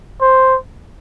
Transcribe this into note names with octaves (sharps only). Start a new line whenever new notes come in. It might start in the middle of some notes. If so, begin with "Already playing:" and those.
C5